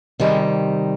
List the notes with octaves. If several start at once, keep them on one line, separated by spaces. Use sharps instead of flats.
C3 D#3 G3 G#3